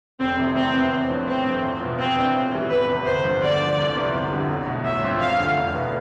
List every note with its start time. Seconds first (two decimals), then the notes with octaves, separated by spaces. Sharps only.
0.20 F1 C4
0.38 F2 C3 E3 A3
0.56 E2 C4
0.73 C3 E3 B3
0.91 A1
1.09 A2 F3 B3 D4
1.27 A1 C4
1.45 G2 F3 A3
1.63 E2
1.81 B2 B3 F4
1.99 F2 C4
2.17 E3 B3 D4 F4
2.34 A2
2.52 E3 G3 B3 E4
2.70 E1 B4
2.88 E2 C3
3.05 G1 C5
3.24 G2 F3 B3
3.42 D2 D5
3.60 D3 F3
3.78 C2
3.96 C3 F3 B3
4.13 G1
4.31 F2 D3 G3
4.49 B1
4.67 B2 A3
4.84 A1 E5
5.03 G2 F3 C4 F4
5.20 E1 F5
5.39 D2 D3 A3
5.56 F1
5.74 E2 B2 B3 E4